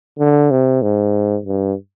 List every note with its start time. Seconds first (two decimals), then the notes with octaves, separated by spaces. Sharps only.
0.19 D3
0.51 C3
0.82 G#2
1.46 G2